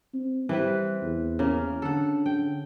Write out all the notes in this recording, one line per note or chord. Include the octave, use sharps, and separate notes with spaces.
C4
E3 G3 C4 B4
E2
C#3 A#3
D3 A4 F#5
G5